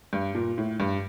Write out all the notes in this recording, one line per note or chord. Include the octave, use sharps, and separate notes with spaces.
G2
A#2
A2
G2